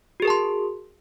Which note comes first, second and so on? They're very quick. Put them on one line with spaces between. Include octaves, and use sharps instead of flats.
F#4 G#4 A#4 A5 C6